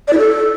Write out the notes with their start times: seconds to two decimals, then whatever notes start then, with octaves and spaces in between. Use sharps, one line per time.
0.07 D5
0.13 E4
0.18 A4